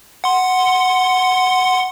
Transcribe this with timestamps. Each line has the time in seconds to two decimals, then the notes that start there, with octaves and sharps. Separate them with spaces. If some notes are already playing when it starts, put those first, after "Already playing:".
0.24 F#5 C6